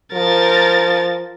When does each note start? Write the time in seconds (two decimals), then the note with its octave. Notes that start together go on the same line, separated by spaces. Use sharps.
0.13 F3 A#4 A6